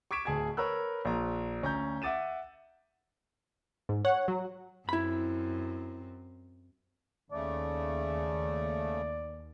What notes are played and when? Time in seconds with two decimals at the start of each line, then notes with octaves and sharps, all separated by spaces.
0.11 C#6 D6 G#6 B6 D7 E7
0.25 D1 D2 G#4 A5 G#6
0.57 A#4 B4 C#5 E6 F#6
1.05 A#1 A#5
1.62 D2 C#4 A#5 G6
2.02 E5 F#5 D6 A6 D#7 E7
3.89 G#2
4.05 C#5 F#5
4.28 F#3
4.89 F#2 C4 E4 B5
7.32 D#2 C#3 A3 D5